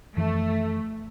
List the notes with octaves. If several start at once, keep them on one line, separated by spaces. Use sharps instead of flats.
F#2 E3 F3 A3